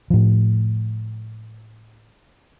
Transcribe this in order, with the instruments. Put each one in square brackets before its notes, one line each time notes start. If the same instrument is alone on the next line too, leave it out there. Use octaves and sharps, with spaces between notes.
[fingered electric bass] A2 F3